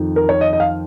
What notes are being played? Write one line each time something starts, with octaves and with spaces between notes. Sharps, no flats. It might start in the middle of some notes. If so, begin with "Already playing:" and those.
Already playing: F2 D#3
A#4
C#5
D#5
D#5
F5